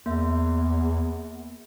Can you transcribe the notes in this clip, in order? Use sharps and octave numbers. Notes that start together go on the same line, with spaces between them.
E2 A#3 E5